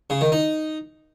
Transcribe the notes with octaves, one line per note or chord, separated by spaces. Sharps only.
C#3
D#3
D#4